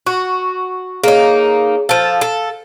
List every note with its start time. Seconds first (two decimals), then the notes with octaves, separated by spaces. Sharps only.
0.07 F#4 C#6
1.04 A#3 D#4 G#4 C#5
1.89 F3 A4 F5 A5
2.21 A4